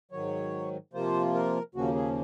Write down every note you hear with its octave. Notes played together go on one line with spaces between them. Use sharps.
G#2 D#3 F#3 C#5
C3 F3 A#3 F4 C5
A#4
D#2 C#3 F3 A#3 C#4 F#4
G#4